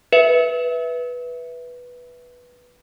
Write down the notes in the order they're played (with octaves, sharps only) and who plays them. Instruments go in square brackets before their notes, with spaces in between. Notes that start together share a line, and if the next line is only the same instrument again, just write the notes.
[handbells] B4 E5